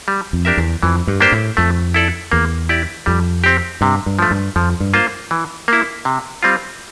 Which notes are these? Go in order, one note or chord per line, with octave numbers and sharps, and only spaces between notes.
G3
F2
D4 G4 A#4 E5
E2
F2 E3
G2
A#3 D4 G4 C5
A2
F2 A3
E4 A4 D5
E2 A#3
E4 G4 D5
F2 G3
C4 G4
G2 C3
G2
F3 A3
G2
F2 F3
G2
A#3 F4 C5
E3
A#3 E4
C3
G3 C4 F4